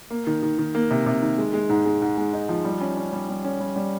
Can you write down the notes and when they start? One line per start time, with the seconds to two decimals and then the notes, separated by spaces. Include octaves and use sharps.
0.10 A#3
0.27 D#3
0.43 D#3
0.59 D#3
0.75 A#3
0.90 C3
1.06 C3
1.22 D#3
1.38 G#3
1.54 G#3
1.69 G#2
1.86 G#3
2.02 G#2
2.18 G#3
2.33 D#4
2.49 F3
2.65 G3
2.81 C#4
2.97 C#4
3.13 G3
3.29 G3
3.44 C#4
3.61 G3
3.76 G3